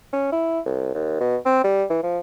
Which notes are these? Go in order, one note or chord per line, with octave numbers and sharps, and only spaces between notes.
C#4
E4
C2
D#2
B2
C4
G3
E3
F3